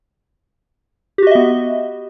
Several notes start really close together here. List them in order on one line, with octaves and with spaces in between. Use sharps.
G4 F#4 D#5 E5 B3